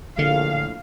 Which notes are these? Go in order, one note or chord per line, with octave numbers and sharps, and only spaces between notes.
A#1 A2 D3 F5